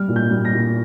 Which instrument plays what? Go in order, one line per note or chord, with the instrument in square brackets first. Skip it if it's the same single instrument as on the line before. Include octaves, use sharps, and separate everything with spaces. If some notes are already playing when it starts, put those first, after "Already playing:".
Already playing: [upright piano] G3 F6
A#2
G6
G3
A#6
A#2